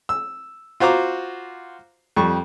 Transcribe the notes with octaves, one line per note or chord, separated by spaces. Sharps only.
E6
F4 F#4 C5 A#5 D6
F2 G3 C#6